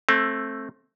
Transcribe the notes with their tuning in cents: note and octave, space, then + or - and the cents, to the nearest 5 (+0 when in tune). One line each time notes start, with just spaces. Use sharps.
A3 +0 C4 +25